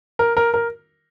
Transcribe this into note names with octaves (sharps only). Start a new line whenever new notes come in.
A#4
A#4
A#4